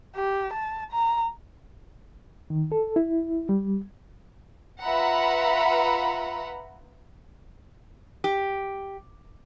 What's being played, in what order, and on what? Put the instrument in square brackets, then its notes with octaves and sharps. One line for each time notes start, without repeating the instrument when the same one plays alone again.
[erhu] G4
A5
A#5
[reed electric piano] D#3
A4
E4
G3
[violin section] F4 B4 E5 F#5 A#5 B5
[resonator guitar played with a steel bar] G4